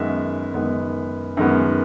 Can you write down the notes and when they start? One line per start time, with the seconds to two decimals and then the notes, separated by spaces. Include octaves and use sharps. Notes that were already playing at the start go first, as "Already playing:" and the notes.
Already playing: F#2 D#3 G#3 B3 E5
0.54 F#2 D#3 G#3 B3
1.37 F#2 D#3 G#3 B3